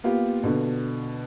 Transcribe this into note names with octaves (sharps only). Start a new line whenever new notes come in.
A#3 B3 F4 G4
B2 D3